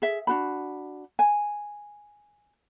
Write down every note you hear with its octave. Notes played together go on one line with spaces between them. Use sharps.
G#4 E5
D4 F#4 B5
G#5